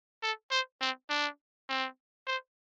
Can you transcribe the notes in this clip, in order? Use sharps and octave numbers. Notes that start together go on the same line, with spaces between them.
A4
C5
C4
D4
C4
C5